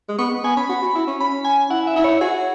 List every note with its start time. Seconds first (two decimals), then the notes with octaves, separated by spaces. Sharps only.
0.09 G#3
0.19 B3 C#6
0.31 B3
0.43 B3 G#5
0.56 C#4 B5
0.69 F#4
0.83 F#4
0.95 E4
1.07 C#4
1.20 C#4 B5
1.45 G#5
1.70 E4 F#5
1.87 E5
1.96 E4
2.04 C#5
2.21 F#4 G#4